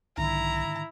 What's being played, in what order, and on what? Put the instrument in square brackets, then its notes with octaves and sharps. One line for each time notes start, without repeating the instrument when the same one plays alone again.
[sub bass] B1 [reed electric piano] G#2 D3 D#3 [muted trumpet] E4 [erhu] A#5